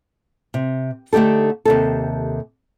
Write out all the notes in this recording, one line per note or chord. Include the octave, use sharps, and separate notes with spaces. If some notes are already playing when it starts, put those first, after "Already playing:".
C3
D3 A3 D#4 G4 A4
D#2 C3 A4